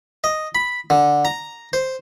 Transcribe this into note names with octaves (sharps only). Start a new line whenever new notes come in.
D#5
B5
D3
A#5
C5